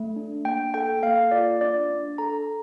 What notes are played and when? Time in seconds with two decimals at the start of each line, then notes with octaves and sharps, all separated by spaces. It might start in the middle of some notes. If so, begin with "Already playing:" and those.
Already playing: A3
0.16 D4
0.45 A#3 G5
0.74 A4 G5
1.03 A#3 F5
1.31 F4 D5
1.61 D4 D5
1.90 D4
2.18 A4 A#5